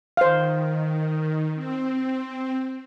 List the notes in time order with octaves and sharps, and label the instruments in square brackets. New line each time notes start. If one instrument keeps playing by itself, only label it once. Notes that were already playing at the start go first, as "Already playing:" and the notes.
[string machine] D#3 [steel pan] C5 F5
[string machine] C4